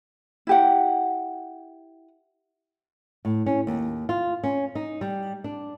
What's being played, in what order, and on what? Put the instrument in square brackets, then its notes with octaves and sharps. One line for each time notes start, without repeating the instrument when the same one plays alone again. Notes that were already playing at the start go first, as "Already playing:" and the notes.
[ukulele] E4 G4 F#5
[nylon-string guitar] A2
C#4
D#2
F4
C#4
D#4
G3
D4